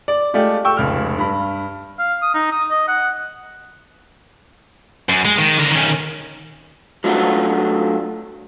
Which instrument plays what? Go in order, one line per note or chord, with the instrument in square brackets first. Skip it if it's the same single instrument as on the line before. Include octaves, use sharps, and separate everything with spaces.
[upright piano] D5
G#3 A3 F4 G4 D5
G5 C#6 E6
F1 C#2 F6
G2 B5
[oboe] F5
D#6
D#4
D#6
D#5
F#5
[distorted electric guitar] F#2
G#3
D#3
D3 A#4
D#3 C#4
[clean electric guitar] F#3 A3 D4 F4 F#4